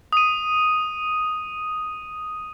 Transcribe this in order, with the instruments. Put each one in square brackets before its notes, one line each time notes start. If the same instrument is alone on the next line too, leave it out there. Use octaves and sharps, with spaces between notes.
[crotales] D#6 D#7